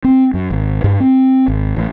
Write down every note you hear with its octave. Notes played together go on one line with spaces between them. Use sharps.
C4
F#2
G#1
G2
C4
G#1
A1